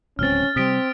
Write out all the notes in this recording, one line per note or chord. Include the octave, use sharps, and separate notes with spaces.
D1 C#2 C4 C#4 F6 A6
C3 G3 C4 D#6 B6 D7